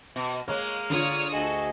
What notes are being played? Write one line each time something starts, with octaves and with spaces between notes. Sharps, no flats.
B2
G#3 A#3 C#5 F6
D3 F4 C#5 D5 D#6
D2 F#4 G#4 A4 D#5